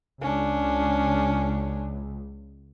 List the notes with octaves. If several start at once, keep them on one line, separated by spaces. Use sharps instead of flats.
C#2 C#4 D4